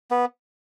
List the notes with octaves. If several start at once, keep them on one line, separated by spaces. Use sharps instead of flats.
B3